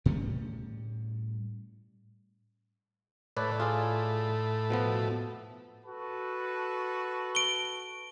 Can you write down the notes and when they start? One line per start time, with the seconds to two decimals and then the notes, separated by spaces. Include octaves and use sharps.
0.06 A2 G3 C#4
3.37 A2 B4 C#5 D5
3.60 F4 G#4 D5
4.70 B2 F3 B3
5.85 F#4 A4 B4
7.35 D7 G7